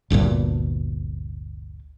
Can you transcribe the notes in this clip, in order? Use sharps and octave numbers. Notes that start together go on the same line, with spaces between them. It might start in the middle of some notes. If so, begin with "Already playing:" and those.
G1 D2 G2 A#2